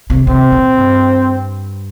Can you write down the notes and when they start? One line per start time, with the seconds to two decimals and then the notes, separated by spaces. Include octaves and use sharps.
0.10 C3
0.27 C3 C4
0.52 A#2
0.78 G2